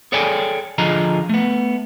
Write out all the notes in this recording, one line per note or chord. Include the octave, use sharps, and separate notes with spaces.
G#4 A4 C#5 D5 G5 G#5
D3 F3 F4 G#4 D#5 A#5
A3 B3